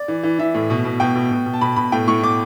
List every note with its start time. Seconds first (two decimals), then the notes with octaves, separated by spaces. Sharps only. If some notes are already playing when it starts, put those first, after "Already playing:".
Already playing: D5
0.08 E3
0.23 E3
0.39 E3 E5
0.54 A2
0.70 B2
0.85 B2
1.00 B2 G5
1.15 B2
1.31 B2
1.46 B2
1.53 A5
1.61 B2 B5
1.76 B2 B5
1.92 A2 G5
2.07 A2 C#6
2.22 A2 D6